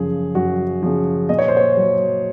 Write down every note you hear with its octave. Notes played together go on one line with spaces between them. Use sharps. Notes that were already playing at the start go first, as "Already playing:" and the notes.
Already playing: F#2 C#3 F3 G#4
F#2 F#4
C#3 F3
A#2 D#5
C#5
C5
C#5
F#3